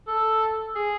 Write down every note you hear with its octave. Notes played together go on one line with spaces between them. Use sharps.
A4
G#4